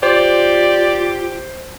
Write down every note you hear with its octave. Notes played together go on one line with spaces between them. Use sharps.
F4 G4 C5 D5